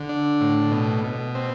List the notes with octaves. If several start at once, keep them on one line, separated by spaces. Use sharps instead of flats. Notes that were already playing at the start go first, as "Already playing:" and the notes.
Already playing: D3
D4
A2
B2
B2
C4